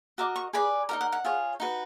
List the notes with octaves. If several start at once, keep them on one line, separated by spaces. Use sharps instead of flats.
F#4 A#4 D#5 D6
C#6
G#4 B4 D5 B5
D#4 F#4 A#4 A#5
F#5
F#5
F4 G#4 C#5
D#4 F#4 B4